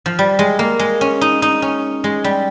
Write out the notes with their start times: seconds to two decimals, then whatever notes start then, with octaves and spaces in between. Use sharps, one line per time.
0.06 F3
0.19 G3
0.39 G#3
0.59 A#3
0.79 G#3
1.01 C#4
1.21 D#4
1.42 D#4
1.62 C#4
2.04 G#3
2.24 G3